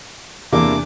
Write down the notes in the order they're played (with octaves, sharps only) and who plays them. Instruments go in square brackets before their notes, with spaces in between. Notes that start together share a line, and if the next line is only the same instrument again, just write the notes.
[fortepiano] E2 [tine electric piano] C3 D4 [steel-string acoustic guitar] A#3 E4 F4 [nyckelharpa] D6